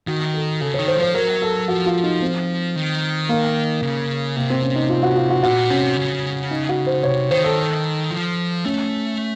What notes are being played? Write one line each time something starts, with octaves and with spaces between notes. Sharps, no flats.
D#3 F#4
A4
C#3 A4
C#5
D#3
C5
F3
C5
F#3 A#4
A4
F3 F#4
F4
D#4
C4
D#3
A#3
C#3
C3 A#3
C4
C#4
D#4
F4
F#4
F4
F#4
A#2 F#4
C3 C#4
C#3
D#4
F#4
C5
C3 C#5
D#3 C5
A4
F3
A3 C#4